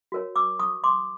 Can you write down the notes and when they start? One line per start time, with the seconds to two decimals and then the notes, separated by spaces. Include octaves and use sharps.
0.12 F#4 A#4 C#5
0.36 D6 E6
0.59 C#6 D#6
0.84 C6 D6